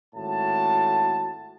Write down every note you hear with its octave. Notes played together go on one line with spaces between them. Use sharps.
G#1 A2 F#4 A5